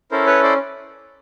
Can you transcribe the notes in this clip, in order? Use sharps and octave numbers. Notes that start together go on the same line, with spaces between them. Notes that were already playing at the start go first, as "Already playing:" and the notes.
C#4 E4 A4 A#4 C5
B4 C#5
C5 D5